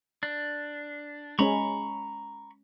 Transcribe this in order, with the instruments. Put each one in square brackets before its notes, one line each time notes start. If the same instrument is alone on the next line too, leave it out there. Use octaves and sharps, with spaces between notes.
[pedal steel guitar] D4
[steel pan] G#3 C#4 C#5 [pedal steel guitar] A#5 B5 C#6